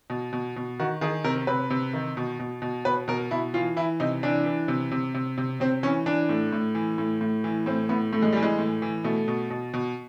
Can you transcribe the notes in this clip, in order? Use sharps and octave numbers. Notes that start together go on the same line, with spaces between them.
B2
B2
B2
D#3 F#4
D#3 G#4
C3 A#4
C3 B4
C3
D#3
B2
B2
B2
B2 B4
B2 A#4
B2 E4
E3 F4
E3 E4
C3 D#4
E3 D4
E3
C3
C3
C3
C3
C3 C4
E3 C#4
E3 D4
A2
A2
E3
A2
A2
E3
A2 C4
A2 B3
A2 A3
G#3
E3 G3
G#3
A2
E3
B2 A3
B2
B2
B2